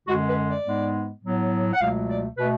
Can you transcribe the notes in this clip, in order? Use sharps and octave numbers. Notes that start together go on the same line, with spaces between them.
F#2 D3 G#3 F#4
B4
D5
G#2 G#3 B3
A2 F#3 B3
F#5
C#2 B2 F#3 A3 F5
D5
B2 A3 B4